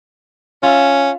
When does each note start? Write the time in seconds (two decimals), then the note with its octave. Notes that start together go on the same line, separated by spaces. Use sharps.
0.63 C#4 F4 E5